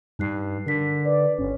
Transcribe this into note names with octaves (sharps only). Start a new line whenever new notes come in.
G2 D#4 F#6 C7
D3 A#4 B6
B4 D5
G1 C#4